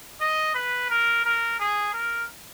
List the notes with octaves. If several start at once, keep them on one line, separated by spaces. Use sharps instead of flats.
D#5
B4
A#4
A#4
G#4
A#4